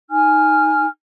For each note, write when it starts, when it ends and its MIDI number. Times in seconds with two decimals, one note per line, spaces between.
0.10 0.85 63
0.10 0.85 80
0.10 0.85 89